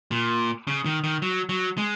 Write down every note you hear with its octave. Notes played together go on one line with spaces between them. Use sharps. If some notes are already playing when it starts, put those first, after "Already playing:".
A#2
C#3
D#3
D#3
F#3
F#3
G#3